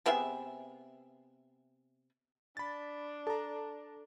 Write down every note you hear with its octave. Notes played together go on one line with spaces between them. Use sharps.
C3 B3 G#4 E5
D4 B5 A6
A4 A5 A#5